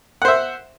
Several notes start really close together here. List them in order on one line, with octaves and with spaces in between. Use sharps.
F#5 C5 E5